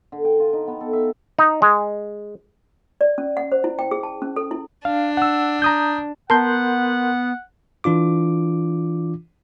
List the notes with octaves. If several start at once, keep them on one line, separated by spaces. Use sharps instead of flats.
D3
G5
F4
D#4
B3
A4
E5
D#4
G#3
D5
C#4
F#5
C5
E4
G5
G#4
A5
C#4
A4
E4
D4 F5
F#5 E6
A#5 D#6 G6
B3 A#4 F#5 A5 C6 G6
E3 D4 F4 D6